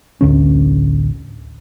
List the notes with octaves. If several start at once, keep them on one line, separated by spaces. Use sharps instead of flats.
A1 D2 D3 C#4